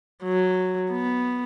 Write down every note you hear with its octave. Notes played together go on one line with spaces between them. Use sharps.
F#3
B3